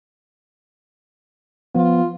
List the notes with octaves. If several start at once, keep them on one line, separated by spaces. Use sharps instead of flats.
F3 B3 F4